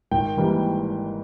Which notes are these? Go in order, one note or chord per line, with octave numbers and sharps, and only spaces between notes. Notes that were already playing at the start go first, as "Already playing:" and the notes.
G#1 G5
G#2 E3 G3 A#3